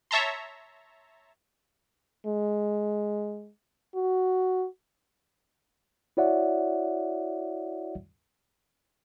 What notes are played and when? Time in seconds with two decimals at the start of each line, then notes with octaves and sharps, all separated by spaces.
0.11 C#5 E5 A5 A#5 C6
2.27 G#3
3.95 F#4
6.17 E4 F#4 C#5 D5 E5 F#5